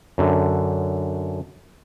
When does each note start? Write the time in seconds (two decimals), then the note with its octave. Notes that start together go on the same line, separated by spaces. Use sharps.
0.18 F#2 D3